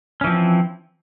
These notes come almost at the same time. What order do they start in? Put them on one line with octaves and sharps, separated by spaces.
C#4 E3 F3 C4